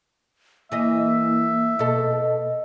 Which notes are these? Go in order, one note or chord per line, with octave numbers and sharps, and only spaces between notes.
E3 A#3 D#5 E5
B2 A4 D#5